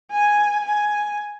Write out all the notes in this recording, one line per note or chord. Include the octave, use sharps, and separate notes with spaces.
G#5
G#5